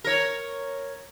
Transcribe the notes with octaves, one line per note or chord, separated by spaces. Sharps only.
A#4 C#5